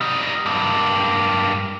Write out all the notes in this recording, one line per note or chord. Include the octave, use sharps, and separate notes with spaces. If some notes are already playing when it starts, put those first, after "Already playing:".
G3 D#4
G2 A#3